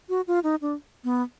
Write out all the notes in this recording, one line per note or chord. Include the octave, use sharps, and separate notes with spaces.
F#4
F4
D#4
D4
B3